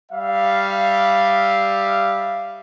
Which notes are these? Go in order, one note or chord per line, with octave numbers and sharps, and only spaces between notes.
G3 E5 F5